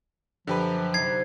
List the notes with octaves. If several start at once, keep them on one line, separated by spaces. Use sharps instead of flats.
F#2 D3 F3 G4 B4
C3 B3 D#4 G#6 C7